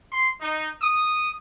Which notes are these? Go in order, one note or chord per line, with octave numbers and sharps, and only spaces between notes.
C6
D#4
D#6